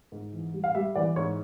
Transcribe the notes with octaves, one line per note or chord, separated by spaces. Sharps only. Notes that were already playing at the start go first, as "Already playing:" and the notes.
G#2
E3
G3
F5
G3 E5
E3 D5
G#2 C#5